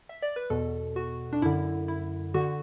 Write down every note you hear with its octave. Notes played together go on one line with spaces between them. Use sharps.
E5
D5
B4
E2 B2 A4
F#4
D4
F#2 D3 E4
E4
D3 F#4